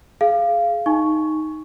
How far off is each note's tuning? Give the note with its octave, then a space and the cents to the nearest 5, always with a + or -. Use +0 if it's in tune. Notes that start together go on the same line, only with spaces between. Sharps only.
G#4 +20 F5 -15
D#4 +0 G#5 +0 C#6 +0